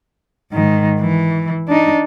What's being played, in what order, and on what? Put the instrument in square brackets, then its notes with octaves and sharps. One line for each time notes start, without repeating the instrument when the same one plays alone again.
[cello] G#2 D#3
E3
D4 D#4